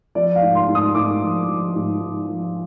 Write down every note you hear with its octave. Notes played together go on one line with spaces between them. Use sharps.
F3 D5
F5
G#2
C6
G#2
D#6
G#2 D6
F3
F3
G#2
G#2
F3